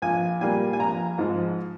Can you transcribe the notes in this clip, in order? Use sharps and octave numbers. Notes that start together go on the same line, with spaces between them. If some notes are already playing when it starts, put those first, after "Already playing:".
A#1 G#5
A#2 G3 A#3 G#5
G#5
A#1 A#5
G#2 F3 G#3